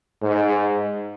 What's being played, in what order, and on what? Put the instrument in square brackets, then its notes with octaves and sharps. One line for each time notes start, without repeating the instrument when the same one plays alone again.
[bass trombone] G#2